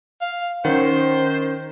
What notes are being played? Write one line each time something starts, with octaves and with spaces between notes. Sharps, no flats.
F5
D#3 C#4 C5 F#5